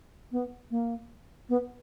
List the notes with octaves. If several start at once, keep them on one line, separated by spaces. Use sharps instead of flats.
B3
A#3
B3